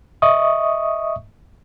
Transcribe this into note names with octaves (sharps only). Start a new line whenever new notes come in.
D#5 E5 C#6 D#6